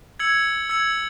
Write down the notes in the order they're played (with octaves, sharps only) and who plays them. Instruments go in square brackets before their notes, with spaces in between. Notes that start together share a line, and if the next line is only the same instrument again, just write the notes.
[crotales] E6 G#6 C#7 F#7
E6 G#6 C#7 F#7